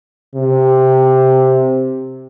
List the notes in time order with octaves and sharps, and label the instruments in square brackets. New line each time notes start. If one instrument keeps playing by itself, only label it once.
[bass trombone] C3